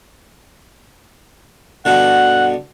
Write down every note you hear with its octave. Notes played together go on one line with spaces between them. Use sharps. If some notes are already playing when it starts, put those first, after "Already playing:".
G2 B2 D3 F#5